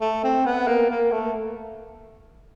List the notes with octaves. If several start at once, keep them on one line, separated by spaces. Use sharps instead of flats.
A3
C4
B3
A#3
A#3
A3